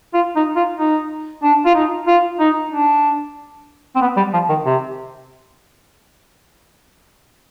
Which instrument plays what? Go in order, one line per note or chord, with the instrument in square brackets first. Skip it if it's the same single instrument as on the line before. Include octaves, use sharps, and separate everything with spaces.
[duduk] F4
D#4
F4
D#4
D4
F4
D#4
F4
D#4
D4
C4
B3
G3
F3
D#3
C3